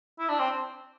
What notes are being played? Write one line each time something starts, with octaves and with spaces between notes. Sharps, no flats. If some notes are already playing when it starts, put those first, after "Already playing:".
E4
D4
C4